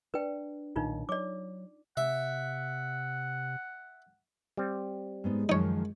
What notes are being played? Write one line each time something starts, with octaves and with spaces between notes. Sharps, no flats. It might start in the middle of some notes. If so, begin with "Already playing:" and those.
D4 B4 G5
B1 A#2 D#3 D4 D#4 F4
F#3 D5 D6
C3 E5 F#5
G3 C4
G#2 G#3 B3 D#4
F#2 D#3 F3 D#4 C#5